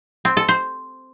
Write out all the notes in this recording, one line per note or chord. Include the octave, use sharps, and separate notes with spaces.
C4
A4
C5